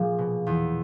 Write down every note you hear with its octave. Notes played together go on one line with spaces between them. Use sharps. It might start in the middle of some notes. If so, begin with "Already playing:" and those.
Already playing: A#2 F3 G#4
B2
E2